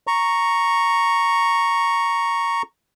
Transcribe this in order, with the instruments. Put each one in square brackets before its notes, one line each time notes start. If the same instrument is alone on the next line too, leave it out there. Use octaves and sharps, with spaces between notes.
[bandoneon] A#5 C#6